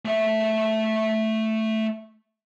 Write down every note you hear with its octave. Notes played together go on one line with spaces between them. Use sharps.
A3 E5